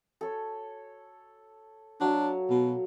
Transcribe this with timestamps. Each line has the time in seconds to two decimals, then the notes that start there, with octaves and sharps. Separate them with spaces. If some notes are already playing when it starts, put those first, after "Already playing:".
0.21 A4 C#5
2.01 F#3 D4 F5
2.50 B2